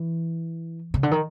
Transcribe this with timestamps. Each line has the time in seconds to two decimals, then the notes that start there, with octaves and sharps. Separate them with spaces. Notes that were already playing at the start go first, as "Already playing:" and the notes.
Already playing: E3
0.94 C#3
1.03 D3
1.11 D#3